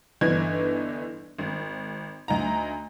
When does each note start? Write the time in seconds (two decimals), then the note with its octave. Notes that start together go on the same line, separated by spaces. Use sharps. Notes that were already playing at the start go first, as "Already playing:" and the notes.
0.21 G1 E3 D4 D#4 G#6
1.39 G#1
2.28 D2 D#4 A#5